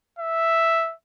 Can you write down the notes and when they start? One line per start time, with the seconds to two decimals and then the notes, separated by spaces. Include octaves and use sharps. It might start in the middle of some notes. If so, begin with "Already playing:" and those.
0.19 E5